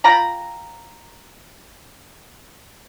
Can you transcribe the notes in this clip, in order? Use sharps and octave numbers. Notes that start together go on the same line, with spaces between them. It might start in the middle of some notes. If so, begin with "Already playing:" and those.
F4 G5 A#5 B5